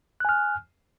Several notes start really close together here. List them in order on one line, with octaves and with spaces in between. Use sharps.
F#6 G#5 F6